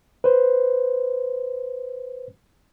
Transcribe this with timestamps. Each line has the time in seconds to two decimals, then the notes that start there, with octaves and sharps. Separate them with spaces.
0.24 B4 C5